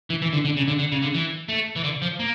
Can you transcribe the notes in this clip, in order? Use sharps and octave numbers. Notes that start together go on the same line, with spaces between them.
E3
E3
D3
D3
C#3
D3
D3
C#3
D3
E3
A3
E3
D3
F3
A#3